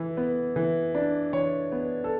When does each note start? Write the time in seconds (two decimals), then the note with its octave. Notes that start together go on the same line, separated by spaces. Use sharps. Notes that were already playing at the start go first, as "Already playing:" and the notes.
Already playing: E3
0.17 B3
0.56 E3
0.95 D4
1.33 E3 C#5
1.72 B3
2.04 A4